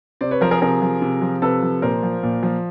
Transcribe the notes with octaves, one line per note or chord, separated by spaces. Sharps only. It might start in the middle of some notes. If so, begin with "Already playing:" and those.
C3 C5 D5
B4 C#5
F3 A#4 C5
G#4 A#4
C3 G#4 A#4
F3
C3
F3
C3 A4 B4
F3
A#2 A#4 C5
F3
A#2
F3